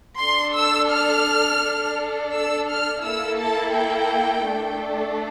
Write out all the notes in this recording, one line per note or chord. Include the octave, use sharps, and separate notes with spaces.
D4 A4 C6
E6
F6
D4 A4
E6
F6
A#3 E4 A4 E6
A5
G5
A3 D4 A4